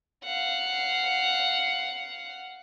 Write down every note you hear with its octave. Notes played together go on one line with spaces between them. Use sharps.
F5 F#5